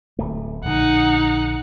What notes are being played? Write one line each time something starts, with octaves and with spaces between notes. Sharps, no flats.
D1 A3
A#1 D3 D#4 F#5